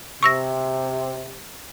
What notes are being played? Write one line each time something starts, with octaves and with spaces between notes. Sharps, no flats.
C3 C#6 E6 A#6